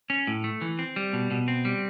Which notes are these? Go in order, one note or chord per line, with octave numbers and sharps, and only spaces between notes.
C#4
A2
A3
E3
C4
G3
B2
B2
C4
G3